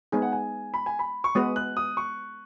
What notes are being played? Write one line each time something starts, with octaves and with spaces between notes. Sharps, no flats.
G#3 B3 D#4 G#4 G#5
F#5
G#5
B5
G#5
B5
C#6
G#3 B3 F#4 B4 D#6
F#6
D#6
C#6